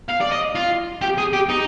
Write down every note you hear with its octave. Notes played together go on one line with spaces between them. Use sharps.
F5
D5
D#5
F4
G4
G#4
G4
D#4